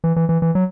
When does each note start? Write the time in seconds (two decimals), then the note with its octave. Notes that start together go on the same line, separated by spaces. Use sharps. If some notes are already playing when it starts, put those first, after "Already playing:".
0.04 E3
0.16 E3
0.29 E3
0.42 E3
0.55 F#3